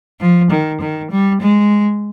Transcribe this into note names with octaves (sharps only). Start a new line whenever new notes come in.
F3
D#3
D#3
G3
G#3